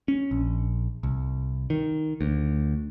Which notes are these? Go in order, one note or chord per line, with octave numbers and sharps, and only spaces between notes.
C#4
A#1
C2
D#3
D2